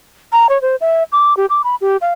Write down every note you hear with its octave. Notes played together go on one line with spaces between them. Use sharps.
A#5
C#5
C5
E5
D6
G4
D6
B5
G4
F5